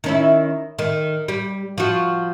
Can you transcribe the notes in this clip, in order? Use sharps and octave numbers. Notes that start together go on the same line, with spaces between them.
D#3 C#4 E4
D#3
G3
F3 F#4